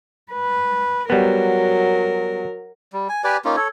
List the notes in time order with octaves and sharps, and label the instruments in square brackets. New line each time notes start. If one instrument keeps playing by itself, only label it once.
[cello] B4
[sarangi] F#3 [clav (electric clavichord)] G3 B3 [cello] A#4
[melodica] G3
G#5
G4 B4 D5 G#5
A#3 C#4 D#4 F4
A4 C#5